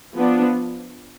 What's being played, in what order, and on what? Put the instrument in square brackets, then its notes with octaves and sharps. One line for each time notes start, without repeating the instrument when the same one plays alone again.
[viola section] F3 B3 D4